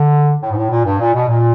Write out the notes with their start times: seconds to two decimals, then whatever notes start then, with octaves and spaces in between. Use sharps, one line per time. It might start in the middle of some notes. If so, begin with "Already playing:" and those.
Already playing: D3
0.42 A2
0.52 G#2
0.56 A2
0.71 A#2
0.85 G2
0.99 A#2
1.14 B2
1.28 A#2